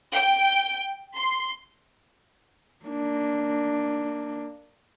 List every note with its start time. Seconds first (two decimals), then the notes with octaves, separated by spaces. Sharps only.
0.13 G5
1.15 C6
2.86 A#3 D4